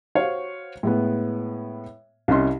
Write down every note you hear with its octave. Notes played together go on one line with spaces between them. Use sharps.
F#4 C5 C#5 F5
A2 G#3 B3
C2 C#4 D#5 C6